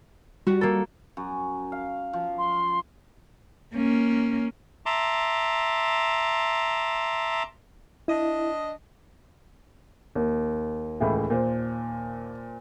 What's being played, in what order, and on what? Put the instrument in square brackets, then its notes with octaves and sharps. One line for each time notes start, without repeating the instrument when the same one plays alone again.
[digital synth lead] G3 [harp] F#4
[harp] A#3 A4
[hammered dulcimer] F#2
F5
F3
[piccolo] C6
[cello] A#3 C#4
[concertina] E5 A5 A#5 C6 D6
[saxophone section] D4 D#5 [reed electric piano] E4
[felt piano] D#2
[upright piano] C#2 A2 E3
A#2 C5